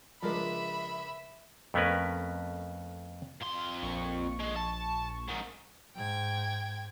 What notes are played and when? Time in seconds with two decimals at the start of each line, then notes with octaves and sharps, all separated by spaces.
0.23 C#2 F3 G#3 D4 A#4 E5 B5
1.74 F2 A3 B3 C#4 A#4 B4
3.42 F2 C6
3.82 A#1 C#6
4.40 G#3
4.56 A5
5.29 G#2 D#3
5.96 G#2 G5 G#6